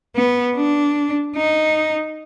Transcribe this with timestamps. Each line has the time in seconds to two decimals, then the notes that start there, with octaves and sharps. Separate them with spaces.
0.16 B3
0.56 D4
1.36 D#4